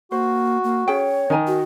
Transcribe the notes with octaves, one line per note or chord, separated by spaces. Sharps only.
A#3 F#4 C5
A#3
C#4 G#4 C#5 G5
D#3 A#4 G#5 A#5
F#4